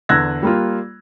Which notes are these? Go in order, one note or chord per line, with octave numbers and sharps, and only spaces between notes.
E2 D3 E6 F#6 G#6 A#6
G3 A#3 F4